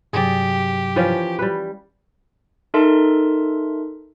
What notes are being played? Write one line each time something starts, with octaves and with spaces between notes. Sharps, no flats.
G2 C3 F#3 G4 G#4 D5
E3 F3 C#4
G3 B4
D#4 A4 A#4 E5 A5 C6